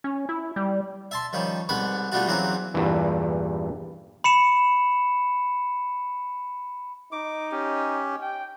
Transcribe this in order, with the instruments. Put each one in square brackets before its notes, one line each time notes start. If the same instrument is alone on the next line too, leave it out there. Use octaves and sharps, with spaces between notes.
[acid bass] C#4
E4
G3
[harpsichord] E5 A5 C6
D#3 F3 G3 C#4
C2 G#2 B3 F#5 B5 C#6
G3 A3 B3 D4 F4 F#4
E2 E3 F#3 A#3 C4 C#4
[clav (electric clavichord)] E2 G2 A#2 E3
[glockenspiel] B5 C#7 E7
[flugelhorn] D#4 [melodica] D6
[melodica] C#4 G4
[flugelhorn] G5